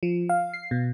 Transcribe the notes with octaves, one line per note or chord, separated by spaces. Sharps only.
F3
F5
C7
B2